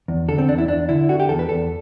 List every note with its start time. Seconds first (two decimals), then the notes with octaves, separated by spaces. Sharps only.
0.08 E2
0.28 D3 A4
0.38 C4
0.48 E2 D4
0.58 E4
0.68 E2 D4
0.89 D3 E4
1.09 D3 F#4
1.20 G4
1.29 E2 A4
1.39 B4
1.49 E2 A4